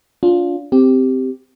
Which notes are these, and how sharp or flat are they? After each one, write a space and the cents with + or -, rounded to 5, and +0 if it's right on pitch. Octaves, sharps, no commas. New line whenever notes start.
D4 -35 F4 +10
C4 -10 G4 +0